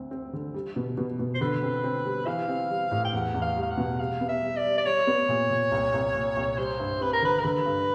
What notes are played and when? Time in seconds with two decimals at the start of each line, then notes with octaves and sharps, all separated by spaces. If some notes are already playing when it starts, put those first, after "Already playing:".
Already playing: D2 C4
0.11 C4
0.33 D3
0.54 G3
0.76 B2
0.98 B2
1.19 B2
1.34 C5
1.41 D3 B4
1.63 C4
1.84 C4
2.05 G3
2.27 E3 F5
2.48 C4
2.70 G3
2.91 A2
3.04 G5
3.13 E2 F#5
3.34 E2
3.42 F5
3.56 G3
3.62 F5
3.70 F#5
3.78 B2
3.99 G3 F5
4.21 B3
4.29 E5
4.42 G3
4.57 D5
4.64 G3
4.78 D5
4.86 G3 C#5
5.07 B3
5.29 A#2
5.50 A#2
5.72 C2
5.94 C2
6.15 A#2
6.36 C2
6.58 G3 C5
6.80 G2
7.01 C4 B4
7.13 A#4
7.22 D3 B4
7.39 A#4
7.44 D3 B4
7.66 G2